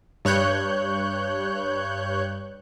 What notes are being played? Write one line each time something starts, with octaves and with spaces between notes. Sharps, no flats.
G2 C#5 F#6 G6